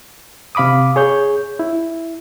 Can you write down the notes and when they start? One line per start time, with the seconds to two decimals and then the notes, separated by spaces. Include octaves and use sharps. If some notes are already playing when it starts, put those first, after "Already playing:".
0.55 C3 F5 B5 D6 D#6
0.96 G#4 C#5 G6
1.59 E4